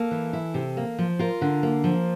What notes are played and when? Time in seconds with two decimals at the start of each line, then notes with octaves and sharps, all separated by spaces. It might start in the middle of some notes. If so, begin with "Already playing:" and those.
Already playing: A#3 A4
0.11 E3
0.33 E4
0.54 C3
0.77 A#3
0.99 F3
1.19 F4 A#4
1.41 D3
1.63 A#3
1.84 F3